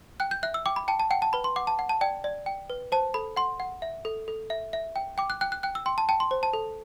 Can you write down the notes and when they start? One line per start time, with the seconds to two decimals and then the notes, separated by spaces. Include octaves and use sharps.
0.20 G5 F#6
0.31 G6
0.43 E5 F#6
0.54 E6
0.66 G5 D6
0.76 B5
0.88 G5 A5
1.00 A5
1.11 F#5 G5
1.22 A5
1.33 B4 B5
1.44 C6
1.56 F#5 D6
1.67 A5
1.79 F#5
1.89 A5
2.01 D5 G5
2.24 D5
2.46 G5
2.70 B4
2.92 C5 A5
3.14 A4 B5
3.36 F#5 C6
3.60 F#5
3.82 E5
4.05 A4
4.28 A4
4.50 E5
4.73 E5
4.96 G5
5.18 G5 D6
5.30 F#6
5.41 G5 F#6
5.52 F#6
5.63 G5 F#6
5.75 E6
5.86 G5 C6
5.98 A5
6.09 G5 A5
6.20 C6
6.31 C5
6.43 A5
6.53 A4